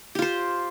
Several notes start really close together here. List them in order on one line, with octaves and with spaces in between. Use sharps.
G4 F4 C5